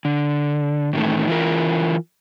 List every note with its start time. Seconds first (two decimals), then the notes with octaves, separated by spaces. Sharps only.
0.05 D3
0.93 A2 D#3 E3 A3
1.28 E3 F4 A#4